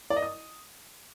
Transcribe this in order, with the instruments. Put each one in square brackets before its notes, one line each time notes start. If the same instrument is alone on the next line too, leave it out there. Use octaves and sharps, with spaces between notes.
[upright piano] D5
D#5
D#6